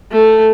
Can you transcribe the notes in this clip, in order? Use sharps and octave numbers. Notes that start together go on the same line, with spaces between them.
A3